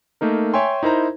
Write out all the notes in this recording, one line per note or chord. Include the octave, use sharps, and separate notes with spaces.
A3 A#3 D#4 A#4
C#5 E5 G5 G#5 C6
D#4 E4 A#4 C5 A#5